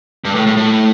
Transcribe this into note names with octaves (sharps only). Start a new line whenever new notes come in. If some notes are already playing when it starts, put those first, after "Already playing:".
G2
A2
A2
A2